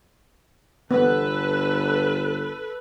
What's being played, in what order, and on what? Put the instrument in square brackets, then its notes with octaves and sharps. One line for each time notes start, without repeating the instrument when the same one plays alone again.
[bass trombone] G1 [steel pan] B3 [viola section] A4 B4